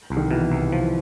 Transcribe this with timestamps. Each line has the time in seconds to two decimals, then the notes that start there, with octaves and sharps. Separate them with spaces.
0.10 C2
0.17 D#3
0.31 B2 E3
0.52 C2
0.72 F3